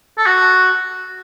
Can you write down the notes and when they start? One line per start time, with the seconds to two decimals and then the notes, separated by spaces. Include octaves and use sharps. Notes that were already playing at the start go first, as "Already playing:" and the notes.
0.18 A4
0.26 F#4